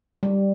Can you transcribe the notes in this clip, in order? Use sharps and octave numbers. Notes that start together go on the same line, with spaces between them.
G3